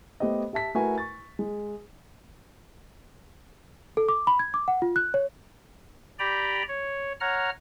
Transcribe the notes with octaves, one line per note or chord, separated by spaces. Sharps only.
A3 B3 G4 C5 D#5
G4 E5 A5 B6
A3 E4 F#4 A#4 B4 G#5
C#6 A6
G#3
A4
D6
B5
G#6
D6
F#5
F4
F#6
C#5
G4 D5 G5 A#5 B5
C#5
C#5 F#5 A#5 F6